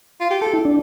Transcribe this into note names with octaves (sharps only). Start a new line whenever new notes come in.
F4
G4
G4 A4
E4
D4